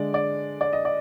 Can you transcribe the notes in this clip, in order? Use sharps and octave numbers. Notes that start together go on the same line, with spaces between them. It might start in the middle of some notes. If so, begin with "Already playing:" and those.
Already playing: D3 G#3 D5
D5
D5
D#5
D5